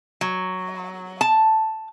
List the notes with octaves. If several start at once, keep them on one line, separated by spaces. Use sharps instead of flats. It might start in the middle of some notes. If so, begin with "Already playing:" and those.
F#3
A5